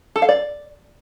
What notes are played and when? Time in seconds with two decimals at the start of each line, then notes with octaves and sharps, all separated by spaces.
0.16 A4
0.22 F5
0.29 D5